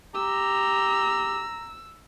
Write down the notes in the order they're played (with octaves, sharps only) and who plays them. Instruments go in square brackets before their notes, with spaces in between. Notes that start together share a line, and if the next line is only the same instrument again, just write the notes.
[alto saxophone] G4 [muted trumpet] A#5 [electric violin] E6